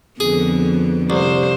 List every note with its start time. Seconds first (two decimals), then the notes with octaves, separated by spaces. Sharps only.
0.20 F2 D3 B3 G#4
1.10 C2 C5